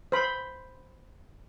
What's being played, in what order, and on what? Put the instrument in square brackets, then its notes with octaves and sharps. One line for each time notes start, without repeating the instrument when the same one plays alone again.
[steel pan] C5 B5